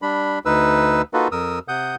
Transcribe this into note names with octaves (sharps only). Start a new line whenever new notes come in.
G3 D4 B5
D2 D#4 B4 E6
A#3 D#4 F4 F#4 A4 B4
F2 A#4 D#6 E6
C3 F#5 D#6 G6